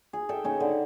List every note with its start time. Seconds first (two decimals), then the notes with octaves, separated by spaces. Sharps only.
0.13 G#4
0.29 A4 E5 G5
0.44 C#3 C#4 D#4
0.60 D3